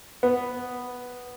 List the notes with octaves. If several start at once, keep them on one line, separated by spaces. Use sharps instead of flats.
B3